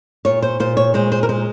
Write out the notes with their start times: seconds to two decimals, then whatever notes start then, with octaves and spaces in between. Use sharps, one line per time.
0.25 A#2 C#5
0.42 C5
0.60 A#2 C5
0.77 C#5
0.94 G#3 C5
1.12 C5
1.23 A#4
1.29 G#3 C5